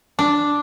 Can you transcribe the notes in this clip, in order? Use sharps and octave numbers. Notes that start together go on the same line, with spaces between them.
D4